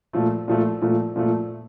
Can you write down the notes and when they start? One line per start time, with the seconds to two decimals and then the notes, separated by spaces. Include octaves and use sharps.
0.13 A#2 F3 A3
0.48 A#2 F3 A3
0.82 A#2 F3 A3
1.16 A#2 F3 A3